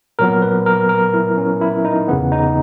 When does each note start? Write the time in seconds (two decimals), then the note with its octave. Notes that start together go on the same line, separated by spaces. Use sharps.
0.19 A#2 F#3 B3 A#4
0.42 B4
0.66 A#4
0.89 A#4
1.14 E4
1.38 C#4
1.61 E4
1.85 D#4
2.08 E2 C#3 E3 B3
2.32 D#4